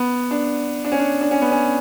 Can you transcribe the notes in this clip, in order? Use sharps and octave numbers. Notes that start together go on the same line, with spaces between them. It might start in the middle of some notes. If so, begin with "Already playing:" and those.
Already playing: B3
D4
D4
C#4
D4
D4
C#4
B3
C#4